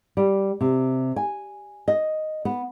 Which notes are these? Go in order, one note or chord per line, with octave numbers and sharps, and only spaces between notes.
G3
C3
G#5
D#5
B3